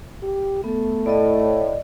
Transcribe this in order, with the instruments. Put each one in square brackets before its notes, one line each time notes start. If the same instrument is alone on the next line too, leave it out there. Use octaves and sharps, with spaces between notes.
[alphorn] G4
[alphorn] A3 [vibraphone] B3 A4
[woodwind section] A2 [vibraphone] D5 D#5